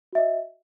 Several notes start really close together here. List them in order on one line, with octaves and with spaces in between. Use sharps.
F#4 E5 D#5